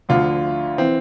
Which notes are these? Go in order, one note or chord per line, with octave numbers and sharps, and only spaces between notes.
D2 D3 F3 F4
E3 C4